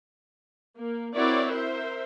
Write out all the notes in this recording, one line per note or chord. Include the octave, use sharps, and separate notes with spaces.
A#3
C4 E4 F#4 A#4 C#5 D5
A#4 C5 E5